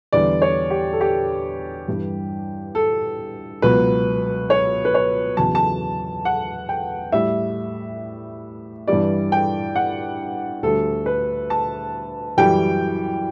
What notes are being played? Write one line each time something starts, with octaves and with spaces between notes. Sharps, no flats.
E2 D3 G3 D5
C#5
G4
A4
G4
G2 E3 G3
A4
C#2 B2 F#3 B4
C#5
B4
C#5
E2 C#3 F#3 A5
A5
F#5
G5
A2 G3 E5
G2 E3 G3 D5
G5
F#5
D2 D3 G3 A4
B4
A5
F#2 E3 G3 G5